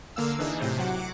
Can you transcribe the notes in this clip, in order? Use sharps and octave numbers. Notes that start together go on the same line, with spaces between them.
D3 A#3 F5 E6
E3 D4 D#4 G#4
A2 C3 C5
F#3 F#5 D6